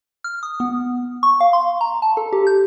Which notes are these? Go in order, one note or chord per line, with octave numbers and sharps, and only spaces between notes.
F6
D#6
B3
C#6
F5
C6
A#5
A5
A4
G4
G6